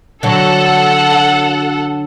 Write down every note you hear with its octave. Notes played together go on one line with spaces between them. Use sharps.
D3 F#3 A4 F#5